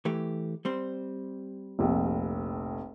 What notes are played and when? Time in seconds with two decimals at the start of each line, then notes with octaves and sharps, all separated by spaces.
0.05 E3 A3 G4
0.65 G3 C4 C5
1.79 F1 A#1 F2